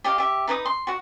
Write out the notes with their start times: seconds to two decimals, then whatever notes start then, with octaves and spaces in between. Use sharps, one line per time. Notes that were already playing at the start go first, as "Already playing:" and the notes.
0.04 G4 D#5 F5
0.18 G4 E5
0.47 D#4 B4 G#5 D#6
0.66 C6
0.87 F#4 F#5